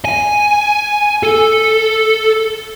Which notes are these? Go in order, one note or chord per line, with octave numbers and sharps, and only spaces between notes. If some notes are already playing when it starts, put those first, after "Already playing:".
G#5
A4